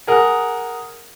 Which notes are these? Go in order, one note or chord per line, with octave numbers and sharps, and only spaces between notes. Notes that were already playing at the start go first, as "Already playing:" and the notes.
G#4 A#4 F#5